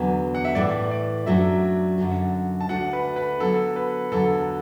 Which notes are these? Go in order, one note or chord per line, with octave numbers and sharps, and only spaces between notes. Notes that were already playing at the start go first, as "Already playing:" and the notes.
Already playing: E2 D3 F#3 B3
F#5
E5
A2 E3 A3 D5
D5
F#2 F#3 A3 D4 F#4 E5
F#2 D3 F#3
A5
D2 D3 A3 D4 F#4 F#5
B4
B4
D3 F#3 B3 A4
B4
E2 D3 F#3 A4